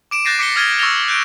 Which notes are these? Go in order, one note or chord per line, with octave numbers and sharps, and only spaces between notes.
D6 D7 E7
F#6 G6 A6 A#6 C7 D#7
D6 B6 C#7 D7 G7
D#6 F6 G#6 A6 D#7 G7
C#6 E6 F6 A6 A#6 F7
F#6 G6 D7 E7